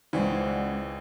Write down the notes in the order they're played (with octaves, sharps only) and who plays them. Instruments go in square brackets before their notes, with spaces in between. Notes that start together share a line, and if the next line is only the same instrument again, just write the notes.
[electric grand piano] C#2 [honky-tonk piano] E3 [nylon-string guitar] G#3 C#4 D4 [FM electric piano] C5 D5 F#5